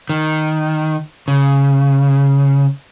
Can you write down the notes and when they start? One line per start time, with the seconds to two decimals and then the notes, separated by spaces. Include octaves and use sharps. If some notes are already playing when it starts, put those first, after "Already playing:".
0.09 D#3
1.28 C#3